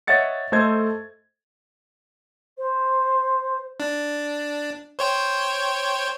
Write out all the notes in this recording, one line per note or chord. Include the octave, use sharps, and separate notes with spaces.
C#5 D#5 E5 F#5 A6 C#7
A3 A4 C5 D#5 G#6
C5
D4
C5 C#5 G5